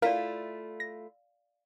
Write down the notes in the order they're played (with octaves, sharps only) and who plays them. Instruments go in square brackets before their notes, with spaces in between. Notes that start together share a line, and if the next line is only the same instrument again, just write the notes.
[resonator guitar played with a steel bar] A3 E4 F4 [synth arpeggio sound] A#4 [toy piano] D5 F5
[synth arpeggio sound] A#6